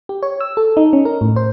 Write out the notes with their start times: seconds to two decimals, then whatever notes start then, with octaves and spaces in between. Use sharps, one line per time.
0.09 G4
0.23 C#5
0.41 E6
0.57 A4
0.77 D#4
0.93 C#4
1.05 A#4
1.21 A2
1.36 C5